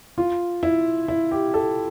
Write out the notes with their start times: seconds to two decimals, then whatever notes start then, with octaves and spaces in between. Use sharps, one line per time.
0.18 F4
0.63 E4
1.08 E4
1.31 G4
1.54 A4